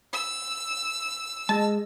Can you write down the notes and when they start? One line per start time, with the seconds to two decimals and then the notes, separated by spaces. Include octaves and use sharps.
0.13 E6
1.49 G#3 G#4 D#5 A5